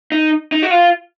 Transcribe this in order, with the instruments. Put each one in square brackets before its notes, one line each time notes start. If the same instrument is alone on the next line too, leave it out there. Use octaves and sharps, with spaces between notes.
[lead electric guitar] D#4
D#4
F#4
F4